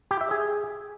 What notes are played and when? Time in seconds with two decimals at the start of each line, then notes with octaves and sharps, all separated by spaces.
0.11 G4
0.21 E5
0.31 G#4